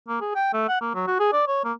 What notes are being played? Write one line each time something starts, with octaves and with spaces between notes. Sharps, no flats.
A#3
G#4
G5
A3
F#5
A#3
F#3
F#4
G#4
D5
C#5
A#3